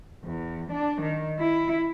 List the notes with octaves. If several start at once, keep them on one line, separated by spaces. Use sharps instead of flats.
E2
D4
D#3
E4